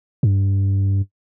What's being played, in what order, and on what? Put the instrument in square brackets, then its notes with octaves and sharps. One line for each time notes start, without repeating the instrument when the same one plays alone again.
[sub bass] G2